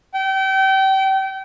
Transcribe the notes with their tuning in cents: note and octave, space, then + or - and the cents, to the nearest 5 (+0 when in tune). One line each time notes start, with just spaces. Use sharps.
G5 -30